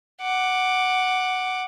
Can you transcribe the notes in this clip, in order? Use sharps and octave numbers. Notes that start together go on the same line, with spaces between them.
F#5 D6